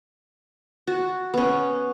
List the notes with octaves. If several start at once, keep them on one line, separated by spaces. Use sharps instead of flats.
F#4
B3 C#4